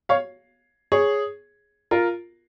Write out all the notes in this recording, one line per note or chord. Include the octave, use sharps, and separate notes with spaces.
C#5 F5
G#4 C#5
F4 A#4